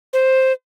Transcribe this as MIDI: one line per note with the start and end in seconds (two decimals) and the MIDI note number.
0.13 0.52 72